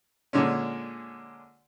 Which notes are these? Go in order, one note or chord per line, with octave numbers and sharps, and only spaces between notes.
A#2 D3 G#3 C#4